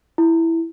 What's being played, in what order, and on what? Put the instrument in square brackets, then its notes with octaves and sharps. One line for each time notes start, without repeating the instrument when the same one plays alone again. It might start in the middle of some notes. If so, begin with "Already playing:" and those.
[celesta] E4